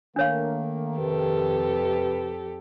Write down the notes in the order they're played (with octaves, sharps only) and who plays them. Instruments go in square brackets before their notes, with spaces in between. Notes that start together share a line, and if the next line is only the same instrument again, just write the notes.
[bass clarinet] D#3 [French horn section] A3 A#3 [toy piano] D4 C#5 F5
[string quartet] F2 G4 A4 [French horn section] C3 B4